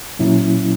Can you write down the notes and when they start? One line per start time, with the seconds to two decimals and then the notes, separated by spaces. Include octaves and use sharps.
0.19 A#2 F#3 C#4 E4